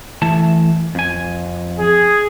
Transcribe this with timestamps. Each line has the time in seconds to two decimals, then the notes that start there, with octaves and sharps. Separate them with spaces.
0.22 E3 A3 A5
0.95 F2 G#5
1.79 G#4